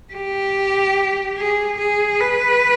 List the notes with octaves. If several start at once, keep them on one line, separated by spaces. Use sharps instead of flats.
G4
G#4
G#4
B4